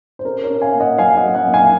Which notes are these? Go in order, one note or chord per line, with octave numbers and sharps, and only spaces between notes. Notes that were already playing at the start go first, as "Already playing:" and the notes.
C5
C#4 A#4
A#4 C#5
C#4
F5 G#5
A#3
D#5 F#5
F#2 F5 G#5
D#5 F#5
F#2
D#5 F#5
A#3
F5 G#5